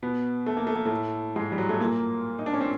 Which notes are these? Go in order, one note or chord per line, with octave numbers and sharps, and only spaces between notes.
B2 B3
A3
A#3
A3
A#3
A2 A3
G#2 G#3
G3
F#3
A2 A3
A#2 A#3
D#4
D4
C#4
C4